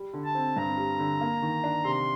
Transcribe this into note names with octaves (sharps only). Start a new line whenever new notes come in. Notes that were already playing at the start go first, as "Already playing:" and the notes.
Already playing: G3
D3
A5
C4
G2 A#5
G3
D3
A#3
D#3
D4
C3 C6